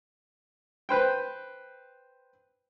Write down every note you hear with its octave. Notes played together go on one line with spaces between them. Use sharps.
B4 C5 G5